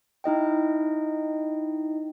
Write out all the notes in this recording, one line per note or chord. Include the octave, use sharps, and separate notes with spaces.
D#4 E4 D#5 G5